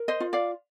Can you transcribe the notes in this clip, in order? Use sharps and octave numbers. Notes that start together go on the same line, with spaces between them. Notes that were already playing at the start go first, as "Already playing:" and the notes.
Already playing: A#4
C5 D#5
F4
D5 F5